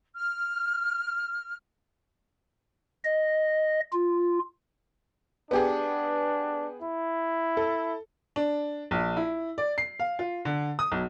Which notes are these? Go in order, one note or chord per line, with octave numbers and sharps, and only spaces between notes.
F6
D#5
F4
B3 D4 G4 G#4
E4
A4
D4
A#1
E4
D5
C7
F5
F4
D3
D#6
B1